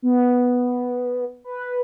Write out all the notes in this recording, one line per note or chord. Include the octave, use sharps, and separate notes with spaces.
B3
B4